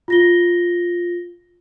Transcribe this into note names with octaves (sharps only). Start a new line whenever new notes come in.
F4 A#6 G7